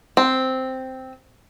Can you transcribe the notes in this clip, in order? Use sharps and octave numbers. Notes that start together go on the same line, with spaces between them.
C4